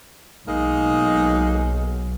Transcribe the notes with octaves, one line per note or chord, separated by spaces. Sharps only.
B1 G#3 A#3 D#4